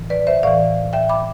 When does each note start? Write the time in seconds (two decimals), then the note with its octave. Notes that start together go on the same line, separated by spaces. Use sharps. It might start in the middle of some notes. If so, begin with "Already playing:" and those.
Already playing: A2 E3
0.10 B4 D5
0.27 C5 E5
0.43 A2 E3 D5 F5
0.93 E5 G5
1.09 B5 D6